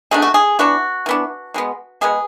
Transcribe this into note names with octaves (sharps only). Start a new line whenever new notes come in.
B2 A3 D4 G#4
F#4
G#4
E3 B3 D4 F#4
E3 B3 D4
B2 G#3 B3
B2 G#3 B3 G#4